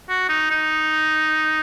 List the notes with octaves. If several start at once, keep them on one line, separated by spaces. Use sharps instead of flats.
F#4
D#4
D#4